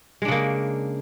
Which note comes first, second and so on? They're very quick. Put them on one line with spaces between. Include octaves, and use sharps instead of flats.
G#3 D4 C#3 A#3